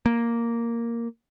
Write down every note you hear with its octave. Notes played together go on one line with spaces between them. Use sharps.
A#3